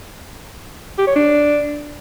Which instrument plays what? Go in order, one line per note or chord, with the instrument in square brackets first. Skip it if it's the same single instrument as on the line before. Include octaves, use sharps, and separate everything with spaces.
[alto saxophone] G4
C#5
D4